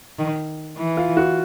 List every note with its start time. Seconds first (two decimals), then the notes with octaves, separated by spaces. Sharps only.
0.19 D#3
0.77 E3
0.97 F4
1.17 F#4